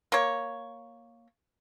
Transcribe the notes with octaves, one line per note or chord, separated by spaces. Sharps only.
A#3 C#5